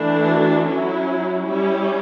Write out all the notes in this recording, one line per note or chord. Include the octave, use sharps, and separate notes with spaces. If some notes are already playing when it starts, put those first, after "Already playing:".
Already playing: E3 A3 D4
F#4
F#3 C#4 E4
G3 C#4 E4